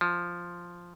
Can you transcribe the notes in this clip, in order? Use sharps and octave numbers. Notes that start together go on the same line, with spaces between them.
F3